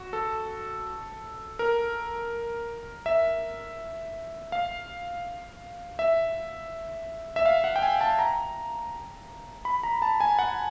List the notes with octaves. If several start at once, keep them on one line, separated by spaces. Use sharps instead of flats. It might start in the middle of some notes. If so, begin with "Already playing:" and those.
Already playing: F#4
A4
A#4
E5
F5
E5
E5
F5
F#5
G5
G#5
A5
A#5
B5
A#5
A5
G#5
F#5